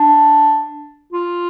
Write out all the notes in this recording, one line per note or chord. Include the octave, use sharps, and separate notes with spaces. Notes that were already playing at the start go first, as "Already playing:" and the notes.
Already playing: D4
F4